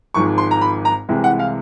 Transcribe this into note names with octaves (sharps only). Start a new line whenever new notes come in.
G#1 G#2 F3 G#3 C#6
C6
A#5
B5
A#5
C2 C3 E3 G#3
F#5
F5